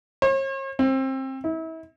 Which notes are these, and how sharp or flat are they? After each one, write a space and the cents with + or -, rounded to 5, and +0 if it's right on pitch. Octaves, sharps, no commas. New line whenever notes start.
C#5 -45
C4 +25
E4 -35